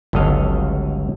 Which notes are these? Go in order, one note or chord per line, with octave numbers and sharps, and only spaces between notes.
G1 C#2 F#3 A4 D#5 F5